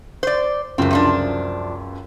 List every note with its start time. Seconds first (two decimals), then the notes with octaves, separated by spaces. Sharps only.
0.23 C5 D5
0.78 C#2 F#2 A2 C4
0.91 C3 F3 D4